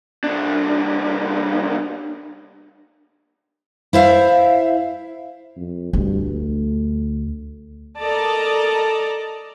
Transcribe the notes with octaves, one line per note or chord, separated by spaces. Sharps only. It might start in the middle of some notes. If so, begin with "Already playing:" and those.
C2 D4
E4 C5 E5 F5
F2
D2 G2
A3
A4 A#4 D5 D#5 A5 A#5